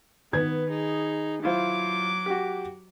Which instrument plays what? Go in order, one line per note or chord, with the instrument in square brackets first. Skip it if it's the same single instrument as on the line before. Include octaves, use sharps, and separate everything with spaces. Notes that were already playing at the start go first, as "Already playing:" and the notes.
[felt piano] D#3 B4 G#6 [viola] B3
[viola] D#4 G#4
[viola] F#3 D6 [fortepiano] E4 F4 C5
[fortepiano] F#4 G4